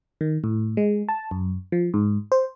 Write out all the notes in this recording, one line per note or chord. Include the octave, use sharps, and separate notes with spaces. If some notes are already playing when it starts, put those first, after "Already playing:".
D#3
A2
G#3
A5
F#2
F3
G#2
C5